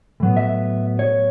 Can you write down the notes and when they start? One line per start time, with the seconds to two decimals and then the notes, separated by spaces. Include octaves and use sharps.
0.20 A2 F#3 B3
0.37 E5
0.99 C#5